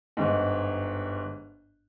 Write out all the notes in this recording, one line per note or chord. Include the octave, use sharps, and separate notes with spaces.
G1 G#2